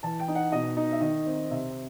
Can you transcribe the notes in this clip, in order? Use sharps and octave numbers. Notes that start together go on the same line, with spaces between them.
E3 A5
G5
D#4
F#5
B2 D#5
D#4
E5
D#3 D#5
C4
C3 E5